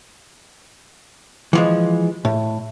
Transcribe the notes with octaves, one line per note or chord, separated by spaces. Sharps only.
E3 F3 G#3
A2